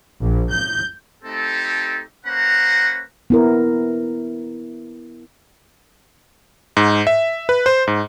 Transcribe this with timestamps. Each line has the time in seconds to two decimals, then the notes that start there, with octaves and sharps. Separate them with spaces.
0.20 A#1
0.51 G6
1.24 A3 C4 D#4 G4 A4
2.26 A#3 C#4 B4 C5 F#5 A#5
3.30 B3 E4 A#4
6.77 G#2
7.07 E5
7.49 B4
7.66 C5
7.87 G#2